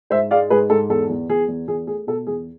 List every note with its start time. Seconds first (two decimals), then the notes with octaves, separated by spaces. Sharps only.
0.10 G#2 C5 E5
0.31 G#3 D5 F5
0.50 G#2 G#4 B4
0.70 G#2 A4
0.89 E2 A4
1.09 E2
1.29 E2 G#4
1.48 E2
1.68 E2 G#4
1.87 A3 G#4
2.07 B2 A4
2.27 E2 G#4